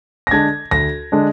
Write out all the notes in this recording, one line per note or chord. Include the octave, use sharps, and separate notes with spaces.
A#6
D3 G#3 D4 G#6
D2 A#6
D3 G#3 D4